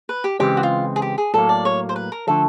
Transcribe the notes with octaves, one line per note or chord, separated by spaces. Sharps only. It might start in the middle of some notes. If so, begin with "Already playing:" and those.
B4
G4
C#2 C#3 E3 G#3 C4 G4
F#4
F4
G#4
G4
G#4
A2 F#3 A#3 A4
D5
C#5
C5
B4
A#4
D3 F3 A3 A4